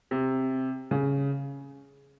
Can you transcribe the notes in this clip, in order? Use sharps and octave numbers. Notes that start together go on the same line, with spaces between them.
C3
C#3